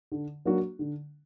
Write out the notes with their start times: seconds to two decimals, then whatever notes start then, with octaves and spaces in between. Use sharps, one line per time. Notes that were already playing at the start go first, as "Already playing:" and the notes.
0.12 D3
0.45 F#3 A#3 D4 F#4
0.79 D3